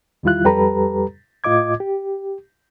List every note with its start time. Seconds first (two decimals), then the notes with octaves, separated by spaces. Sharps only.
0.23 E2 D#3 G3 E4 F4 F#6
0.44 F2 G3 G4 A4 B4 A#5
1.44 A2 F4 D#5 D6 G#6
1.80 G4